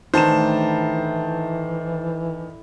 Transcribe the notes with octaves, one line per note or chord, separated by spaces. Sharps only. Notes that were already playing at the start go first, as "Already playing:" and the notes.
A2 D#3 E3 D4 C5 A5 A#5 E7